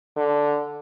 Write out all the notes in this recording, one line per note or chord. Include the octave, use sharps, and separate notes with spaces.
D3